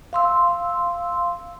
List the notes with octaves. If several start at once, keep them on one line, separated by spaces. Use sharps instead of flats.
F5 C6 E6